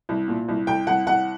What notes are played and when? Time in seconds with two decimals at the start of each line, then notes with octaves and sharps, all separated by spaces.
0.09 C2
0.28 A#2
0.48 C2
0.67 C2 G5
0.87 C2 F#5
1.06 C2 F#5